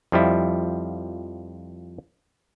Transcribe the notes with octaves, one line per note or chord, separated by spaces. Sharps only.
F2 F3 G3 E4